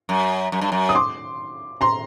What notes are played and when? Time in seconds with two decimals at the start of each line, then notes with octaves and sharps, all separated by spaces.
0.09 F#2
0.52 F#2
0.61 G2
0.72 F#2
0.89 D#6
0.95 C6 D6
1.81 A#5 C6